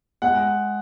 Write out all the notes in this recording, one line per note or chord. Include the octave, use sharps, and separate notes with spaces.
G#3 F#5